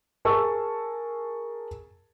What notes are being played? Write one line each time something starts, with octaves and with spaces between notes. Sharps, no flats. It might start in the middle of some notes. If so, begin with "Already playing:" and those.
G#4 A#4 A5 C#6 E6